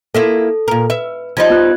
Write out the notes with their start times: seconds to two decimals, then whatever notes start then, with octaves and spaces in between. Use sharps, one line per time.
0.14 A#3 E4 F4 A4
0.68 A#2 A#4
0.90 B4 E5
1.37 F3 G3 D#4 G#6
1.50 B3 F4 F#6